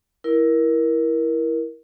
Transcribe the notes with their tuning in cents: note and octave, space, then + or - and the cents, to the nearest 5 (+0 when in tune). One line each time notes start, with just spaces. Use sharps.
E4 +0 A#4 +20